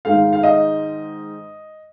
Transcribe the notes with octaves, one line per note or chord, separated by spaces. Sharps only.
G#2 D#3 G#3 F5
F5
D#5